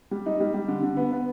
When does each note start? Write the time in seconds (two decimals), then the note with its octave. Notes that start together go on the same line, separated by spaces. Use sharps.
0.11 G3
0.26 D#4
0.40 G3
0.54 G3
0.68 D3
0.83 D3
0.97 B3
1.12 B3